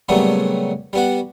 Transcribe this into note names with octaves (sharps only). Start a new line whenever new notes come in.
A#2 C#3 F#3 G3 A3 B3
G3 B3 F#4